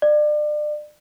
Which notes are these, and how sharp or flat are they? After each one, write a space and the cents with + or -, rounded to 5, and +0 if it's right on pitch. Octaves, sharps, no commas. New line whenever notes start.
D5 +30